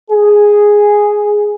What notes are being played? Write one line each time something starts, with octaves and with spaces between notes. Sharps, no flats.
G#4